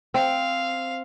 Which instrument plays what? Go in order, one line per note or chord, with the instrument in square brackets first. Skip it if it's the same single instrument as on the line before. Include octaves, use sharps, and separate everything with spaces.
[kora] C4 [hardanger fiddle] F5